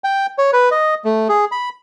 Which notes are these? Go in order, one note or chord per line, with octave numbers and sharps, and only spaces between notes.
G5
C#5
B4
D#5
A3
G#4
B5